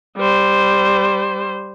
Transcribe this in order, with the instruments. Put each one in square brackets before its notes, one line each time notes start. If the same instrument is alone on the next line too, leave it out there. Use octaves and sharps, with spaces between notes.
[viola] G3 C5